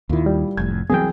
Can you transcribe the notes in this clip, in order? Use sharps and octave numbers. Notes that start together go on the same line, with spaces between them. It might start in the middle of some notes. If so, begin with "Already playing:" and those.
D#2 A#2 D#3 E4
G3
F1 F2 A2 G#6
C2 E3 F#3 G#4 G5